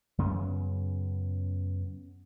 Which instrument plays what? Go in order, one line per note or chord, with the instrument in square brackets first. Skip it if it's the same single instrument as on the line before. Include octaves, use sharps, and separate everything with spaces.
[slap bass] F#2 C#3 B3